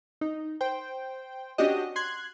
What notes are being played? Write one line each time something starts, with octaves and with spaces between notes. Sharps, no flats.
D#4
C5 G5
C#4 D4 F#4 G4 D#5
C6 F#6 G#6